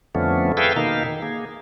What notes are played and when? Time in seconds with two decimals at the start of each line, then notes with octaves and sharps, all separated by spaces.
0.15 F2 D3 F3 A3 B3 C#4
0.57 G#4 A4 B4 E5 F5 G5
0.76 B2 D#3 A#3 D#4 F5
1.06 D#3
1.22 A#3 G#4